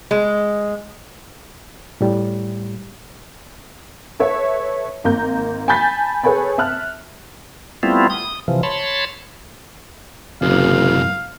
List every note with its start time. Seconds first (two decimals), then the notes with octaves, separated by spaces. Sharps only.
0.11 G#3
2.01 A2 G3
4.19 A4 B4 C#5 E5
5.04 G#1 A#3 A#5 G6
5.68 G#5 A5 B5 G6 A6 B6
6.24 G#4 A4 B4 C#5 G#5 B5
6.58 E5 A5 F6 F#6
7.83 G3 A3 B3 C4 E4 F4
8.10 D#6
8.48 C3 E3 F3
8.63 C#5 A5 B5 C6
10.42 F#1 F#2 C3 F5